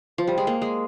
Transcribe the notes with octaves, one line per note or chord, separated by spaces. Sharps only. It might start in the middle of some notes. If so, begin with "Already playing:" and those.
F3
G3
G#3
A#3
G#3